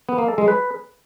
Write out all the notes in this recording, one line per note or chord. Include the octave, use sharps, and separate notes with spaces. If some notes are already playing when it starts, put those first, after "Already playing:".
B3
A#3
A4
G#3
B4